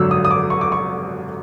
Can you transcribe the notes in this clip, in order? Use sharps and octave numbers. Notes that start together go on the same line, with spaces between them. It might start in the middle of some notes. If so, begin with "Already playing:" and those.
Already playing: G#1 F#2 D3 F#3 E6
D#6
D#6
D6
C#6
D6
C#6